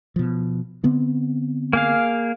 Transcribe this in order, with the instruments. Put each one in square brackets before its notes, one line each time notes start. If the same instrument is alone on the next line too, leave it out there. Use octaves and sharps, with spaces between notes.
[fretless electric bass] B2 F3
D3 B3 C4
[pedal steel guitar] A#3 G#4 F5